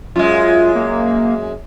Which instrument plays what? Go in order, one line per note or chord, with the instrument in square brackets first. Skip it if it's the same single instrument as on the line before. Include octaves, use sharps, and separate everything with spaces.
[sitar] F#2 G#3 [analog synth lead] F4
[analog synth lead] A#3